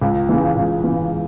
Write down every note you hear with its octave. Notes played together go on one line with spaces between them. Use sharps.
C#2
C#3 E3
C#2
C#3 E3